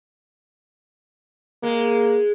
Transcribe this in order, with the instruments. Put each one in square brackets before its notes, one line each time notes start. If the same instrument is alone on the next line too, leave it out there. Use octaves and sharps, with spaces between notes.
[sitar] G#3 [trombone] A#3